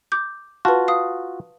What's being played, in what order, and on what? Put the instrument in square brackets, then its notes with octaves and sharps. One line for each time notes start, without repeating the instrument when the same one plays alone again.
[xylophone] D6 G6
[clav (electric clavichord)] F4 F#4 [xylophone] B4 A5
[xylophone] F5 D#6